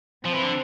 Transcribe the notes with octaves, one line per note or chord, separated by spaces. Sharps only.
F3 C4
E3
D3